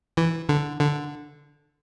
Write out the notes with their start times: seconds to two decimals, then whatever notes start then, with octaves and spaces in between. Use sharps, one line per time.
0.17 E3
0.49 D3
0.81 D3